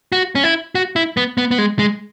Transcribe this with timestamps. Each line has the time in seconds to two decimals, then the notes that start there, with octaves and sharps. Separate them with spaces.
0.12 F#4
0.35 C#4
0.44 E4
0.75 F#4
0.96 E4
1.17 B3
1.38 B3
1.51 B3
1.58 G#3
1.79 G#3